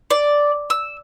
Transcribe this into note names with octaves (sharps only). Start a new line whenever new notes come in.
D5
E6